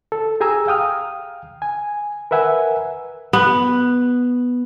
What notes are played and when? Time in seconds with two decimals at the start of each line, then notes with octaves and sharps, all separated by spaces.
0.12 A4
0.40 G4 G#4 G#5 A#5 E6
0.67 F5 G5 D#6 F6
1.62 G#5
2.31 A#4 B4 E5 F#5 G#5
3.33 B3